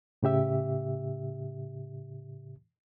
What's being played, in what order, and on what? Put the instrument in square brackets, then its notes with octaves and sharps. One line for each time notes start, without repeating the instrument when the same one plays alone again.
[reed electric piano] A2 C#3 G4 E5